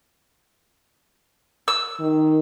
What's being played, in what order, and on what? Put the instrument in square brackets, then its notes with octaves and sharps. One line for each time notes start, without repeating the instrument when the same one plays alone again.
[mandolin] E6
[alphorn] D#3